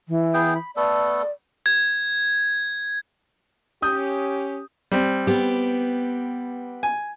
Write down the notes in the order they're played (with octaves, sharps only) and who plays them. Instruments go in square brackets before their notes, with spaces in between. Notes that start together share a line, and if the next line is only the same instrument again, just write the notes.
[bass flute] E3
[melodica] B3 G#4 G5
B5
[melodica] A3 B3 A4 [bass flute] D5
[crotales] G#6
[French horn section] C#4 G4 [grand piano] D#6 G6
[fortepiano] G3 C4
[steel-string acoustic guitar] B3 G4
[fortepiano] G#5